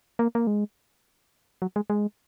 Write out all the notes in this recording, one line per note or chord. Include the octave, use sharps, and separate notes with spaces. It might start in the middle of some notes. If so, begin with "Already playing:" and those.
A#3
A#3
G#3
F#3
G#3
G#3